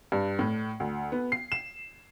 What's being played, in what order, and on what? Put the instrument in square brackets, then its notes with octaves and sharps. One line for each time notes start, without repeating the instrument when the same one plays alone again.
[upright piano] G2
A2
D2
B3
C7
E7